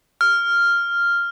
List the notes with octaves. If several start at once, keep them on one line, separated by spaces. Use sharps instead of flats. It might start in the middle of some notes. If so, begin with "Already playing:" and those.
F6